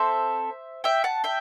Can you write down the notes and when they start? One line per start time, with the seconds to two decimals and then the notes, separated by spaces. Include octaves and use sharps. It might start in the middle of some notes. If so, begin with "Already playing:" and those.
Already playing: C4 A4 C5 E5
0.84 E5 G5
1.04 F#5 A5
1.24 E5 G5